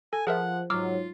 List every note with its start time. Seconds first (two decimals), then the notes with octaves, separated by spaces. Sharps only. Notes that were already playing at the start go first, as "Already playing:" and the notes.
0.13 A4 G#5
0.27 F3 G#4 A#4 E5 F#5
0.70 G#2 F#3 F4 D6 E6 F6